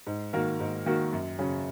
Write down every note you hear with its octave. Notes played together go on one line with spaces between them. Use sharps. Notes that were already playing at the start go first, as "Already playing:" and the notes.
G#2
D#3 A#3 F#4 A#4
G#2
D#3 A#3 F#4 A#4
F#2
C#3 F#3 C#4